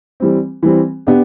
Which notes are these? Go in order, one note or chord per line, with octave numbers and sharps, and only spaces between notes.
E3 G3 C4
E3 G3 C4
B3 D4 G4